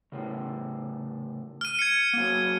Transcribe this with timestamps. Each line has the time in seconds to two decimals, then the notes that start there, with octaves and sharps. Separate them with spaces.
0.12 A2 C#3
1.61 F6 D#7
1.79 G#6 C#7
2.13 F#3 A#3